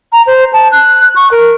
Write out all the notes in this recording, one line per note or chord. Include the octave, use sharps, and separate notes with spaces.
A#5
C5
A5
F#6
C#6
A#4